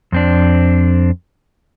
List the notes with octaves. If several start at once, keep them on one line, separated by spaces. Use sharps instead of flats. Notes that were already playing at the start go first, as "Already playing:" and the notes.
F2 C4 D4